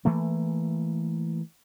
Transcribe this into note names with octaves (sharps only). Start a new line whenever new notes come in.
E3 A3 A#3